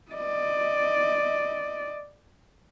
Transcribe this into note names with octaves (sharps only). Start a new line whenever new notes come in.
D5 D#5